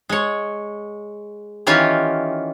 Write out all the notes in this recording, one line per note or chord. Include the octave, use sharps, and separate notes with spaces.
G#3 C#5
D#3 E3 C#4 F4 G4 C#5